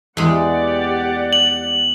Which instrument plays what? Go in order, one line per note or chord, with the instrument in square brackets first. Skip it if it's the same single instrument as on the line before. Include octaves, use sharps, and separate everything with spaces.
[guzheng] E2 G#3 [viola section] G4 D5 F#5
[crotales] F#7